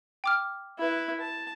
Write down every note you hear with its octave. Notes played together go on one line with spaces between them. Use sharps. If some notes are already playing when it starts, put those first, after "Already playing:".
G5 D6 F6
E4 B4
A5